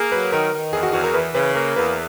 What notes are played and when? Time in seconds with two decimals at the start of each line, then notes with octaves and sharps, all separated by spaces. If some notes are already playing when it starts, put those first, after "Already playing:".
Already playing: A#3 G#4 A#4
0.12 F#3 B4
0.32 D#3 A#4
0.53 D#3
0.73 E2 G#4
0.83 F#4
0.93 E2 F#4
1.04 A#4
1.14 E3 B4
1.35 C#3 B4
1.55 A#3 A#4
1.76 E2 B4